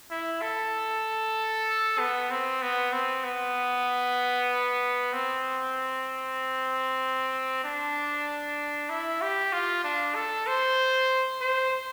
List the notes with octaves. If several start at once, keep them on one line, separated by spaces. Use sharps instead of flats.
E4
A4
B3
C4
B3
C4
B3
C4
D4
E4
G4
F4
D4
A4
C5
C5